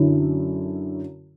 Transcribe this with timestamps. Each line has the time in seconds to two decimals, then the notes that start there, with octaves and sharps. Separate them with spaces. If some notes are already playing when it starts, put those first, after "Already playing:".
Already playing: F#2 D3 F#3 C#4 E4